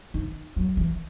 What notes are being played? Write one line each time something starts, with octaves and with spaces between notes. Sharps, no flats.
D#3
F#3
E3